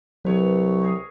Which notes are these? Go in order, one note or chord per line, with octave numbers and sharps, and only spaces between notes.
C2 F#3 B4 C#5
G#4 A#4 C#5